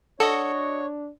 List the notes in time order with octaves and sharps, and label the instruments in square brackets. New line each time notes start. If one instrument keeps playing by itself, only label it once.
[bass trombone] D4 [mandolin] F#4 D#5 [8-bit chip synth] A4 [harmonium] C#5